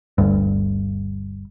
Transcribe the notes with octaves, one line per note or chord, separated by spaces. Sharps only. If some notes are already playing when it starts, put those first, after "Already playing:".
G1 D2 G2